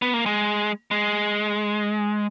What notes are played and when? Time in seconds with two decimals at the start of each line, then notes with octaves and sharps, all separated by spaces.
0.02 B3
0.14 A#3
0.26 G#3
0.91 G#3